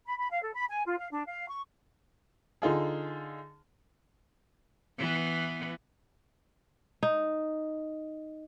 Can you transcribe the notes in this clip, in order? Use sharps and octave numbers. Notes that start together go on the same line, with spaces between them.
B5
B5
F5
A4
B5
G#5
F4
F5
D4
F5
C#6
D3 D#4 F4 G#4
E3 B3
D#4